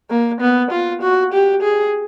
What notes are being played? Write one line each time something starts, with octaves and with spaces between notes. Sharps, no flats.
A#3
B3
F4
F#4
G4
G#4